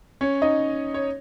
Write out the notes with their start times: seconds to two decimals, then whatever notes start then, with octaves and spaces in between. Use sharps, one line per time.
0.21 C#4 C#5
0.42 D#4 D#5
0.94 C#5